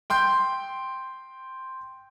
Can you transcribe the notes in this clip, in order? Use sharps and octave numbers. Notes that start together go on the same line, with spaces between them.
G5 C6 G6